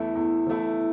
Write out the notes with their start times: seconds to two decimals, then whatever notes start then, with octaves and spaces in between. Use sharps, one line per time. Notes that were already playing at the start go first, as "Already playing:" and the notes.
Already playing: E2 E3 A3 E4
0.15 E2
0.47 E3 A3 E4